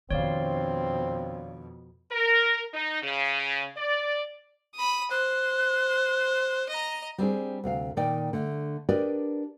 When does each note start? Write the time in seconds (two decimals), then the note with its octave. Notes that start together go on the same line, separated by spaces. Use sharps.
0.11 F2 B2 D#3 C4 D4 C#5 D5 F5
2.12 A#4
2.73 D#4
3.03 C#3
3.77 D5
4.75 B5 D#6
5.11 C5 F#6
6.69 D#5 A#5
7.18 G3 C4 D4 G#4
7.64 D2 C3 F5
7.97 A#2 D#3 D5 D#5 G5
8.33 D3 A3
8.89 D4 G4 A#4 B4 D5 D#5